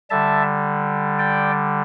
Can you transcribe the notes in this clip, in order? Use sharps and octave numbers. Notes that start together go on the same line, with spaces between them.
D3 G3 E5 A5
D5 G5